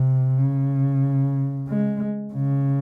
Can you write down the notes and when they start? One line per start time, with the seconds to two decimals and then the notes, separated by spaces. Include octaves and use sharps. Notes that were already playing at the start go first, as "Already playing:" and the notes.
Already playing: C3
0.38 C#3
1.68 G#3
2.33 C#3